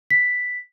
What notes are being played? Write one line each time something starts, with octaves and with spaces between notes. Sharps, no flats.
B6